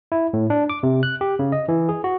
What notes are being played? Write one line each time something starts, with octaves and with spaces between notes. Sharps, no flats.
E4
A2
D4
D6
C3
F#6
G4
C#3
D#5
E3
G#4
F#4